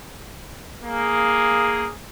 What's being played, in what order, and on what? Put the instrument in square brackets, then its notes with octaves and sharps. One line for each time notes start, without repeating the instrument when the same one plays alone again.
[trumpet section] A#3 G#4